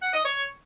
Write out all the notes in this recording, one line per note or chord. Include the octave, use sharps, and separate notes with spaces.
F#5
D#5
C#5